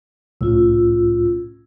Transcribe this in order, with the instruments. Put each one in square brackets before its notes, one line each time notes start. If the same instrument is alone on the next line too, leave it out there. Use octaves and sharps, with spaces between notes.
[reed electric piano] C2 A2 [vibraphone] C#4 F4 E6